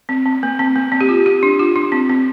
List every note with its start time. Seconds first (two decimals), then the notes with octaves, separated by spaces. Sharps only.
0.09 C4
0.26 C4
0.43 A#3
0.59 C4
0.76 A#3
0.92 C4
1.01 G4
1.09 F4
1.26 G4
1.43 D4
1.59 F4
1.76 D4
1.92 C4
2.09 C4